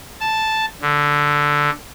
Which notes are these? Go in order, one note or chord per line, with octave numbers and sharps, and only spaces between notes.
A5
D3